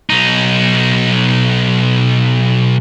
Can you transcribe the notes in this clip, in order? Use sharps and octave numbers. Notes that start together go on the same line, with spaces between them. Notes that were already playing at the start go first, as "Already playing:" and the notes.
B1 D#4